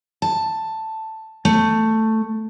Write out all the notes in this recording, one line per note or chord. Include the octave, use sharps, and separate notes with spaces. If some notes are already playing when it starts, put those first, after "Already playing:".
A5
A3